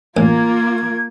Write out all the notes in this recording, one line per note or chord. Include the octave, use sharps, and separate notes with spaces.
A1 A#3 F4 A#4 G#6